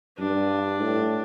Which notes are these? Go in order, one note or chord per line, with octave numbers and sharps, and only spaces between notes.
G2 D4
A2